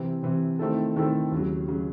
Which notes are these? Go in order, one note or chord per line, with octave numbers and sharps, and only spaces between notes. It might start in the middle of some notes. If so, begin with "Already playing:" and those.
Already playing: C3 E3 C4
C3 E3 C4
D#3 A3 C4 E4 A4
D#3 A3 C4 E4 A4
D#2 C#3 F#3
C#3 F#3